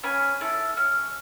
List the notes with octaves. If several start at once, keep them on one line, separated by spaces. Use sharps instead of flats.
C#4 G#5 B5
E4 A4
C#4